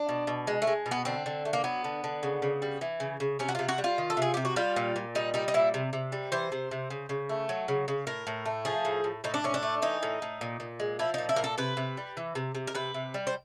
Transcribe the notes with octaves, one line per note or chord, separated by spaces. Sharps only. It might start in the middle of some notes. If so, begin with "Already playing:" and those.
Already playing: D4
B2
B2
G#3
A3
G#3
B2
B3
D3 C4
D3
A3
A#3
F#3 B3
D3
D3
C#3
C#3
G3
E3
C#3
C#3
C3 C#4
F#4
C3 F4
F#4
G3
F4
D#3
A4
C3 G#4
C3 G4
F#4
G3 F4
A#2
A#2
G3 D#4
G3 D#4
D#4
A#2 E4
C3
C3
G3
E3 C5
C3
C3
C#3
C#3
A3
F#3
C#3
C#3
A2 A#4
A2
A3
F3 G#4
A2
A2
A2 D#4
D4
A2 C#4
D4
A3
E3 D#4
A2
A2
A#2
A#2
G#3
F3 E4
A#2 D#4
E4
A#2 A#4
A4
C3 B4
C3
G3
E3
C3
C3
A#4
C3 B4
C3
G3
C5